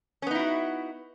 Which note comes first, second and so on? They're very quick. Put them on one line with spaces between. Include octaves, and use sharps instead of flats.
C#4 B3 D#4 E4 F#4